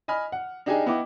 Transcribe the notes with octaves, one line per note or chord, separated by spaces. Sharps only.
D#5 G#5 B5 F6
F#5
D4 D#4 G4 G#4 D#5 G#5
B3 E4 D#5 G5 D6